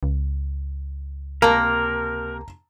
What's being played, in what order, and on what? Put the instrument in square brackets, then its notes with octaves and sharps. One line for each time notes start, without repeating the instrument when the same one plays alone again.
[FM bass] C#2
[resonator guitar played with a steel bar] C3 A#3 [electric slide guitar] A#4 [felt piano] A5 A#5